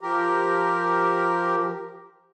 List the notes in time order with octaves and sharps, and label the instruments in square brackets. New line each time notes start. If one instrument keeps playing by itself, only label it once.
[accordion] F3 G4 A#4